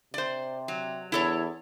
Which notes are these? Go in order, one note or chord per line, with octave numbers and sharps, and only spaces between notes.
C3 C5 D5
F#3
E2 E4 A4 C#5